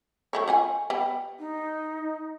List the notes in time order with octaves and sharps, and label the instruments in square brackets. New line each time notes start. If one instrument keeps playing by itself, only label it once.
[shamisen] F#3 A3 C#5
F4 F#5 G#5
G3 B3
[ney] D#4